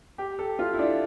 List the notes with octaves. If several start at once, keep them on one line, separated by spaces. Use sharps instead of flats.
G4
A4
F4
E4
D4